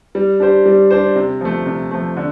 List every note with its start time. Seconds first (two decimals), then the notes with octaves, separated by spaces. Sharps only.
0.15 G3
0.40 D4 G4 C5
0.66 G3
0.91 D4 G4 C5
1.16 C3
1.41 F3 A3
1.66 C3
1.91 F3 A3
2.17 D3